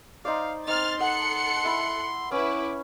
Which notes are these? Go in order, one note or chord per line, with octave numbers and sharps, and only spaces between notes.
D#4 C5 D5 F5
C4 D#4 C6 F6 A6
A4 F#5 F#6 C#7
E4 B5
C#4 E4 B4 D6